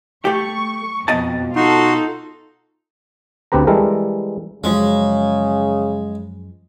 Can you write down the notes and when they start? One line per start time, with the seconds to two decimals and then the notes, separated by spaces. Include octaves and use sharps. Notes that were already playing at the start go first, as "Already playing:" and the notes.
0.25 A3 G4 C#6
1.08 F2 B2 D#5 A5
1.56 D#4 F4 F#4 A4 C6
3.52 D2 C4 G4 B4 A#5
3.67 E3 G3 G#3 A4 A#4
4.64 F#2 C#3 F3 G#3